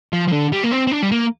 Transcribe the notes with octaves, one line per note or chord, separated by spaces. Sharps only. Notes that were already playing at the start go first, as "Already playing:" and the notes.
F3
F3
D3
G3
A#3
C4
C4
D4
G3
A#3